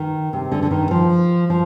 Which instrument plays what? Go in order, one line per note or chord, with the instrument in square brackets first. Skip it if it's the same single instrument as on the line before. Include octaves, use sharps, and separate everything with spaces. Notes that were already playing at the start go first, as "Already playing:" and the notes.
Already playing: [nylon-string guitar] D#3
C3
D3
D3
D#3
F3
F3